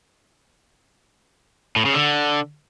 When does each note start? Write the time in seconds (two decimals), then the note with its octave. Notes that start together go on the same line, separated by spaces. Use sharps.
1.76 A2
1.85 C#3
1.95 D3